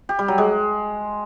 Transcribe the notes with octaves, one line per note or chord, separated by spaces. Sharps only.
G4
G3
F#3
G#3